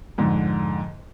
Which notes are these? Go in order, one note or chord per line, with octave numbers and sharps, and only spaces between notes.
F2 G#2 D3